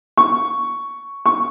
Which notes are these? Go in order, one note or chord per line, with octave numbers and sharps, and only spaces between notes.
C#6
C#6